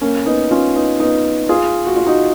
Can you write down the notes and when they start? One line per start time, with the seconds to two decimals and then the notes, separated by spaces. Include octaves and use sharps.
0.01 A#3 C#4
0.26 B3 D#4
0.51 C#4 F4
0.75 B3 D#4
1.00 B3 D#4
1.49 F4 G#4
1.87 F#4
1.96 F4
2.07 D#4 F#4